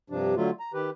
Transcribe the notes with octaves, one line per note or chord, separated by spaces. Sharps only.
G2 C3 F3 D4
D3 F#3 A3 F4
A#5
D#3 G4 B4